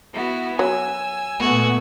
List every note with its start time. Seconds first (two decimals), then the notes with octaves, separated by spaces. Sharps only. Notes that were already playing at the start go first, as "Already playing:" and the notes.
0.13 B3 E4 F#4
0.59 F#3 G#5 E6
1.39 A#2 A3 B3 F#4